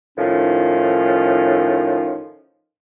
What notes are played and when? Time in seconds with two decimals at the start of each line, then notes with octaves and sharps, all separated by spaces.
0.17 A2 D#3 F3 C#4 D#4